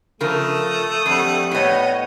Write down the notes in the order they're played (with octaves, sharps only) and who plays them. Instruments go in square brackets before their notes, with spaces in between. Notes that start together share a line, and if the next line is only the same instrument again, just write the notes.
[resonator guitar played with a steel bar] C#3 F3 A#4 [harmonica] A3 [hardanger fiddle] D#6
[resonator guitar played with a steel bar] F2 [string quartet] G3 F#5
[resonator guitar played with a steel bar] A2 B3 [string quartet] C#5 D#5